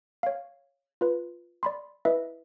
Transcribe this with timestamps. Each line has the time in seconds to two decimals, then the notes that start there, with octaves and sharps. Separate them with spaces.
0.23 C#5 F5
1.01 F4 B4
1.63 D5 B5 C6
2.05 E4 B4 D#5 E5